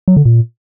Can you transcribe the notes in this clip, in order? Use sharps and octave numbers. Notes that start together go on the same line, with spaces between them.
F#3
D3
A#2